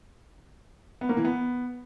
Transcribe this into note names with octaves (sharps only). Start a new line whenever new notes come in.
B3
A#3
E3
B3